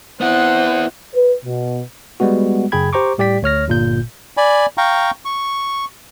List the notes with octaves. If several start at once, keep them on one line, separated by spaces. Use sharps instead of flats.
B3 C4 E4 C5 F#5
B4
B2
G3 G#3 B3 F#4
F#2 C#3 G#4 G5 B5 G#6
G4 C5 A#5 C#6 D6
A2 G3 G4 D5 G5 B6
D2 C#5 F6 A#6
G1 A#2 G6
D5 G#5 B5
F5 G5 A#5 C#6
C#6